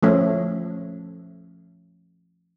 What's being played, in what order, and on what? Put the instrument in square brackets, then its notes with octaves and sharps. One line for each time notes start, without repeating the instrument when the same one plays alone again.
[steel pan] F3 A3 C#4